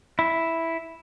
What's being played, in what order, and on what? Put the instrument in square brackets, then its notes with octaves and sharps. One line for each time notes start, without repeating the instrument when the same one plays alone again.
[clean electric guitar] E4